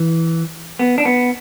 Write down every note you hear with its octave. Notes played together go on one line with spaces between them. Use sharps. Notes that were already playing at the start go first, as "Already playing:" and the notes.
Already playing: E3
B3
D4
B3